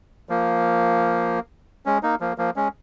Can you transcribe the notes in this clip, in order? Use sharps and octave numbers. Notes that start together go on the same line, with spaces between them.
F3 A#3
G#3 C#4
A#3 D#4
F3 A#3
F3 A#3
G#3 C#4